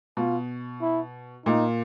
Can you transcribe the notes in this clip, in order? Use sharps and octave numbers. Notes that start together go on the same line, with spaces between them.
B2 F4
E4
A#2 D#4